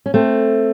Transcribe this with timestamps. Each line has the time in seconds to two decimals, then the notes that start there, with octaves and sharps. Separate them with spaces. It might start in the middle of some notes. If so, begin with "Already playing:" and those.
0.06 C#4
0.14 A3 C4